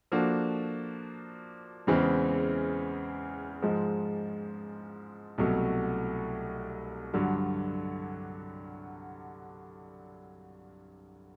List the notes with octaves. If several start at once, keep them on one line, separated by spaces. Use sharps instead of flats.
F3 A#3 D4 F#4 A4
E2 C#3 E3 G#3 C4
G#2 F3 G#3
C2 B2 F#3 A3
G2 D3 F#3